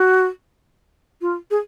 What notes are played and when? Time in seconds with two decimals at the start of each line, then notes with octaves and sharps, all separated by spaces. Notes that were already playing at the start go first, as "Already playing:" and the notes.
Already playing: F#4
1.21 F4
1.51 G#4